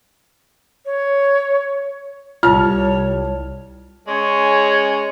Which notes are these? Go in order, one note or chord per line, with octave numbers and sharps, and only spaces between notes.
C#5
C2 G3 F4 C#5 A5 F6
G#3 C#4 G#4 C#5